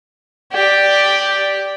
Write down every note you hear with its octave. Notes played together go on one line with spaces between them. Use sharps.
G4 D5